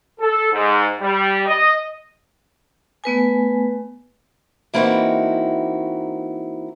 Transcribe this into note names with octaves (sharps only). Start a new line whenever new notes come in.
A4
G#2
G3
D#5
A3 B3 B4 G#5
E3 A#3 C4 D#4 E4 F#4